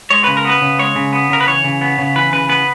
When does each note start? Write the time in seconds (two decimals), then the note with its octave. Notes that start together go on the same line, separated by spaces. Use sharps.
0.11 G#3 C#5
0.24 C#3 B4
0.37 A#4
0.45 B3 B4
0.62 C#3
0.79 G#3 C#5
0.96 C#3
1.13 B3
1.30 C#3 A#4
1.41 B4
1.47 E3 C#5
1.64 C#3
1.81 B3
1.98 C#3
2.16 E3 B4
2.33 C#3 B4
2.49 B3 B4